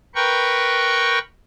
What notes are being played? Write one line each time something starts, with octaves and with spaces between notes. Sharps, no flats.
A#4 B4 G5 C#6